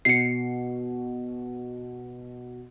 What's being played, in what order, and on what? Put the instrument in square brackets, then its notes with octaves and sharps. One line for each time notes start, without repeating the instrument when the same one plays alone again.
[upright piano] B2 [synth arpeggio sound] C7 C#7